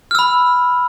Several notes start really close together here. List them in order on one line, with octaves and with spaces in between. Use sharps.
F6 E6 B5